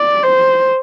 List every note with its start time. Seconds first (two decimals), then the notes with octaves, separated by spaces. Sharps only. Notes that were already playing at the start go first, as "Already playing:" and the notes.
Already playing: D5
0.23 C5